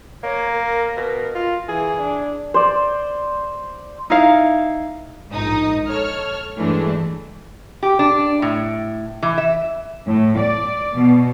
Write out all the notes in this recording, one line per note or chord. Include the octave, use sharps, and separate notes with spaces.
A#3 C#5
A#4
B2
F4
E3 G#4
D4
C5 D5
D#4 E4 F5
A#1 G#2 D#4 D#6
A4 C#5 F6
G2 E3 G#3 A3 D4
G4
D4
A2
E3
E5
A2
D5
B2